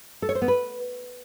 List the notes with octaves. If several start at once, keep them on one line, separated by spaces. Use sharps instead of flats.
A4
C#5
C5
B3
B4